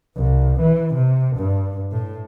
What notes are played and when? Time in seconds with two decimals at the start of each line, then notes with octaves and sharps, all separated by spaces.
0.16 C2
0.61 E3
0.95 C3
1.37 G2
1.92 A2